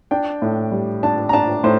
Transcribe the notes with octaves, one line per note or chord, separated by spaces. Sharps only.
D4 G5
A2
G3
D4 A5
A#5
D4 A5
A2 C5